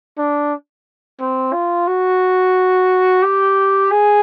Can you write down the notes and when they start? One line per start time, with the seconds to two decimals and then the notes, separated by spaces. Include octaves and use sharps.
0.18 D4
1.20 C4
1.53 F4
1.87 F#4
3.23 G4
3.91 G#4